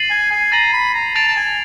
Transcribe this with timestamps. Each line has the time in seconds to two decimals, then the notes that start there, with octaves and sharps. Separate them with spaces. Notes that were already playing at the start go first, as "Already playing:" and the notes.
Already playing: A6 C7 D#7 F#7
0.11 G#5
0.31 G#5
0.52 A#5 A6 C7 D#7 F#7
0.73 B5
0.94 A#5
1.15 A5 A6 D7 F7
1.27 A5
1.37 G#5